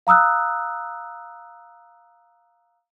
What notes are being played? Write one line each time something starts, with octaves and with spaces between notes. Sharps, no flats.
F5 A#5 D#6 E6 F#6